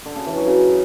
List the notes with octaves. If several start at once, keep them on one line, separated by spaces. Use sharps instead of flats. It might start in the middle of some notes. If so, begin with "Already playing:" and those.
D3
C#3
E3
F#3
C#3